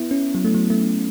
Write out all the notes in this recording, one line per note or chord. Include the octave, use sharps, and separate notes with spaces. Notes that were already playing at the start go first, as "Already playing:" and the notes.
Already playing: B3 E4
C#4
F#3
A3
F#3
A3